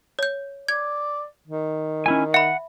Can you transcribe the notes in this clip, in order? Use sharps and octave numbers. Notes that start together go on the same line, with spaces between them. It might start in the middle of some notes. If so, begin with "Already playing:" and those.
C#5 G6
D5 G#6
D#3
C#4 E4 G#5
E5 F#5 B5